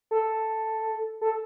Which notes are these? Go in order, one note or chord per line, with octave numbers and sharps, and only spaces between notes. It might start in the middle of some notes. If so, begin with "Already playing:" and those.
A4
A4